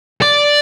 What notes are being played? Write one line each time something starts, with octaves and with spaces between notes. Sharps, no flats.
D5